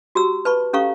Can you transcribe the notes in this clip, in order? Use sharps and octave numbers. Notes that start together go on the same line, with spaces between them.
F#4 G4 A#5 E6
B4 A5 B5 C#6
C#4 G4 A4 F5 A#5 C#6